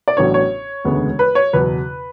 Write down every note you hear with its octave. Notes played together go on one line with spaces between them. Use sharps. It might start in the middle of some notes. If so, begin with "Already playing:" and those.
D5
A1 A2 F#3 B3 D4 C#5
C#5
E1 D2 C#3 G#3 B3
B4
C#5
F#1 E2 B2 F#3 B4